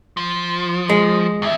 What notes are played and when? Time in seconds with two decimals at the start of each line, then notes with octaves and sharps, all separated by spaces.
0.17 F3
0.90 G#3
1.42 E2 E4